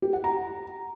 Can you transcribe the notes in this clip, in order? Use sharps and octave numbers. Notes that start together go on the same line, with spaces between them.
G4
F#5
A#5